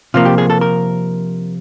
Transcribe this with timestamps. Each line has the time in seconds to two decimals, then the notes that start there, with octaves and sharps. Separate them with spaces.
0.14 C3 F3 A#3 F4
0.25 G4
0.38 G#4
0.50 A4
0.61 A#4